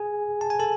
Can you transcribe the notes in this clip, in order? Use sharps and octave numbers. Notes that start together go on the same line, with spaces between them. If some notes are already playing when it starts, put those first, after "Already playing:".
Already playing: G#4 G#5
A5
G#5
A4 A5